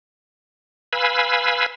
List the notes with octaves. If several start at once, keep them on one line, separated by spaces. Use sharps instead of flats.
B4 F5 G#5 B5 E6